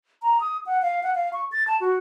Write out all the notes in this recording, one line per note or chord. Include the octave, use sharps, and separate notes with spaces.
A#5
D#6
F#5
F5
F#5
F5
C#6
A6
A5
F#4